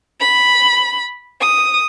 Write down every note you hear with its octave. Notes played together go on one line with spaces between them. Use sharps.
B5
D#6